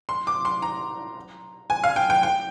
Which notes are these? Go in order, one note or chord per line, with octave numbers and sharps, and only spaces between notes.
C6
D6
C6
A#5
G#5
F5
G5
G5
G5